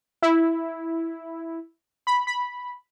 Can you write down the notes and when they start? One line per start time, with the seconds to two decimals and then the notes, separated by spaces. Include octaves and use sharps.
0.22 E4
2.07 B5
2.27 B5